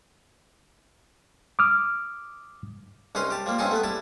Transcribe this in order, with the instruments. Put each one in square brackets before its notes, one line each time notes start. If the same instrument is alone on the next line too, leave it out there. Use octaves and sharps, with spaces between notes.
[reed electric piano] D6 D#6 F6
[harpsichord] C2 C#4 D#4 B4 A#5 C6
G4 A5
F3 G3 A#3
G2 F#3 C4 C#4 D#4 G#5
A3 B3 B4
G3 E4 A5